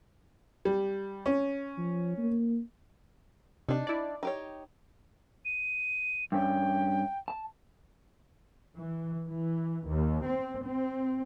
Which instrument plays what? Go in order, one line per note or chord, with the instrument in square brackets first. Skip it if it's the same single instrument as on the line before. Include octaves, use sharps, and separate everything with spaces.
[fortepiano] G3
C#4
[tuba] F3
A#3
[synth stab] C3 [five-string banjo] D4 D#4
[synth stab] E4 D5
[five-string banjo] D#4 G4 C#5
[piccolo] D#7
[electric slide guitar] G2 C#4 [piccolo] G5
[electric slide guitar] A5
[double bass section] E3
E3
D#2
C4
C4